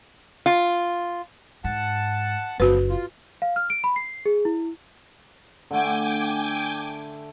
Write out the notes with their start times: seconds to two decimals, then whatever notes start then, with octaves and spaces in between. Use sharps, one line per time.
0.46 F4
1.64 G#2 F#5 A5
2.60 F#1 F3 B3 F#4 B4
2.90 F4
3.42 F5
3.56 F6
3.70 D7
3.84 B5
3.96 C7
4.26 G#4
4.45 E4
5.71 D3 A3 G5 G#5 D6